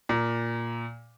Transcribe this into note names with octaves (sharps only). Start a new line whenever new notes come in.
A#2